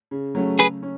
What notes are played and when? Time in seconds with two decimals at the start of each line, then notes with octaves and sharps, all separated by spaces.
0.11 C#3
0.35 F#3 A3 C#4
0.59 C#3 G#4 B4
0.83 C#4